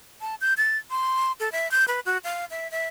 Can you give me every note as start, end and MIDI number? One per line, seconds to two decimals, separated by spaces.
0.21 0.35 81
0.41 0.54 91
0.58 0.77 93
0.90 1.32 84
1.40 1.51 69
1.52 1.70 76
1.72 1.85 91
1.88 2.00 71
2.06 2.18 66
2.24 2.45 77
2.51 2.70 76
2.71 2.88 76